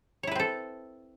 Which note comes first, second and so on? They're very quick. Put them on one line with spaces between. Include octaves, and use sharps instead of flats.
C#5 E4 B4 C4 A4